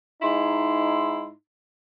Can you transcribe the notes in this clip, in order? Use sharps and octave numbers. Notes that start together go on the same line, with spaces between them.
G#2 D#4 E4 C6